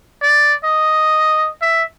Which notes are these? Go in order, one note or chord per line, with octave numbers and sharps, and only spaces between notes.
D5
D#5
E5